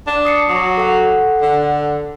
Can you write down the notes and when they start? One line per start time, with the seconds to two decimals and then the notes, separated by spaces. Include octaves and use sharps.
0.07 D4
0.25 D#6 C7 C#7
0.49 F#3 D6 C7
0.77 A4 F#5
1.42 D3